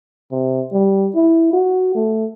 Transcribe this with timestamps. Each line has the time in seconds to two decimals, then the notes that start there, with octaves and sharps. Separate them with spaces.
0.32 C3
0.73 G3
1.15 E4
1.53 F#4
1.95 A3